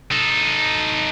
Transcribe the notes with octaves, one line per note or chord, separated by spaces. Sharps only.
D#4 A4